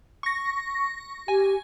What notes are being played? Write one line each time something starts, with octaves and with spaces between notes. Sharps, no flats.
C#6 A#6
G4 G#5